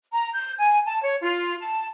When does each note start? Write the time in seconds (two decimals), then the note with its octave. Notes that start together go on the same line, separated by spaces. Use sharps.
0.12 A#5
0.34 G6
0.59 G#5
0.85 A5
1.02 C#5
1.21 F4
1.60 A5